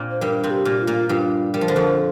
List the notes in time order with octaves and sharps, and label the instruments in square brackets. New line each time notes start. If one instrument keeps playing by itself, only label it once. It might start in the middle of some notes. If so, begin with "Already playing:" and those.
Already playing: [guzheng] A#2 A#3 C4 D4
[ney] C5
[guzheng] G2 G3 [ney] A#4
[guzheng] C3 C4
[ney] G4
[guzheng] A#2 A#3
[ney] F4
[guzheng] A#2 A#3
[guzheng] G2 G3 [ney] F4
[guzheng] G3 [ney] A#4
[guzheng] F3
D3
F2 F3